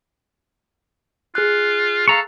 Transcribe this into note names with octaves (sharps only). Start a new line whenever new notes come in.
F4 G#4 F#6
A4 F5 A#5 C#6